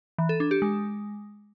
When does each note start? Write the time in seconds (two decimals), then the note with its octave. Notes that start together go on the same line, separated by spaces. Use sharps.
0.18 E3
0.29 A4
0.40 D4
0.51 G4
0.62 G#3